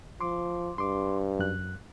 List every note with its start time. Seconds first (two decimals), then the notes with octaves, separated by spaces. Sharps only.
0.21 F3 C6 D6
0.78 G2 C6 D6
1.39 F#2 F#6